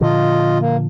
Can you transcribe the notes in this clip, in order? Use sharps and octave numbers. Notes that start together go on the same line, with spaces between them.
A#2 D3 F3 F4 D#5
A#3